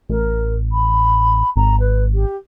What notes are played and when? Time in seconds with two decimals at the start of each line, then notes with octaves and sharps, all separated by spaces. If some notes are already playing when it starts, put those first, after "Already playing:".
0.09 A1 A#4
0.72 B5
1.56 G#1 A#5
1.80 B4
2.13 G4